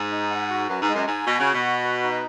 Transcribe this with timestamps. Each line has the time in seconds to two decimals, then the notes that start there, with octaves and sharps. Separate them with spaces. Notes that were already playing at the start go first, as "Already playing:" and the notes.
Already playing: G#2
0.11 D#4
0.31 F#5
0.50 F#4
0.69 F#2 B4
0.82 G#2
0.89 G#3
0.95 F#2
1.07 G#2 G#5
1.26 B2 F#4
1.40 C#3
1.46 F#5
1.54 B2
1.65 F#4
1.84 B4
2.03 D#4